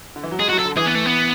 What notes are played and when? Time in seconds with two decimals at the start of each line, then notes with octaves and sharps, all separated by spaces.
0.16 D3
0.23 E3
0.31 F#3
0.39 G#3 G#4
0.49 F#3 F#4
0.59 A4
0.65 D3
0.77 E3 G#4
0.86 B3
0.95 A3
1.05 B3